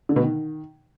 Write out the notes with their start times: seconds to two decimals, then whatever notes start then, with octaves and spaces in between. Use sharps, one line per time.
0.09 D3
0.16 B2
0.23 D#3